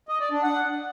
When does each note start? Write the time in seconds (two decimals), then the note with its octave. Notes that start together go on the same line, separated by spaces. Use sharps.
0.09 D#5
0.20 D5
0.31 D4
0.43 F#5